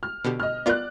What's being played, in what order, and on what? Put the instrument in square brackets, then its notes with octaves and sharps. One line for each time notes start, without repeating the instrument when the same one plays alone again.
[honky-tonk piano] F6
[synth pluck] B2 D3 G4
[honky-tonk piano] D#5 F6
[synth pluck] B3 F4 A#4 [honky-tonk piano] D5 F#6